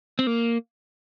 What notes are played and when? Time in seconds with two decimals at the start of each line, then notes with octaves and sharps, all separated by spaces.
0.19 C4
0.27 A#3